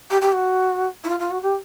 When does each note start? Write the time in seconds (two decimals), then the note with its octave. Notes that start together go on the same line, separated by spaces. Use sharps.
0.10 G4
0.21 G4
0.33 F#4
1.04 E4
1.09 F4
1.20 F4
1.31 F#4
1.42 G4